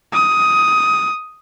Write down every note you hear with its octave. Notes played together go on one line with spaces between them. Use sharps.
D#6